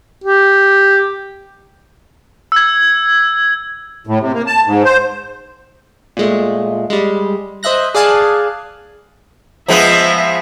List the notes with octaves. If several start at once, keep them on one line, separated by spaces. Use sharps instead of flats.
G4
E6 G#6
A2
C3
A#3
A5
G#2
C5
A#2 G#3 A3
G3 G#3
C5 D#5 E5 F#6 A#6
G#4 D5 F5 G#5 A5 F#6
F3 G#3 B3 E5